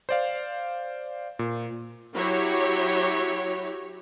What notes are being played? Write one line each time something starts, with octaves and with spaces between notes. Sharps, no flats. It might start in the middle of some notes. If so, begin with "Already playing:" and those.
C5 D5 F5
A#2
F#3 E4 F#4 G4 C#5